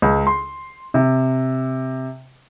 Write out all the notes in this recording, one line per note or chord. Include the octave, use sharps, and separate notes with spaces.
C#2
C6
C3